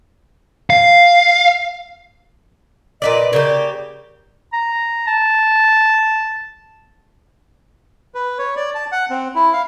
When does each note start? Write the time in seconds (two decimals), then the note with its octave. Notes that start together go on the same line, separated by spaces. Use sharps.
0.70 F5
3.02 A#2 B4 D5 D#5
3.33 C#3 A#3 G4 D5
4.53 A#5
5.07 A5
8.15 B4
8.39 C#5
8.56 D5
8.75 A5
8.92 F#5
9.10 C4
9.35 E4
9.53 F5